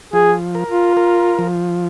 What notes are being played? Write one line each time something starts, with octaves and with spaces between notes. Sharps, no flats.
F3 G#4
A#4
F4
A#4
F3